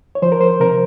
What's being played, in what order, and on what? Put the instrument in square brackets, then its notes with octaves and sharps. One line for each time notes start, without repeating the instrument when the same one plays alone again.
[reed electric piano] C#5
F3 C5
A#4
C5
C3 A#4